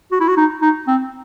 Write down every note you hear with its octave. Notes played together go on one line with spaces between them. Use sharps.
F#4
E4
F#4
D#4
D#4
C4